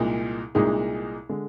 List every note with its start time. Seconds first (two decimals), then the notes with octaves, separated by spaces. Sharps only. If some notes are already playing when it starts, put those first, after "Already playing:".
Already playing: C2 A#2 G#3 D#4 G#4
0.55 C2 A#2 G#3 D#4 G#4
1.29 D3 G#3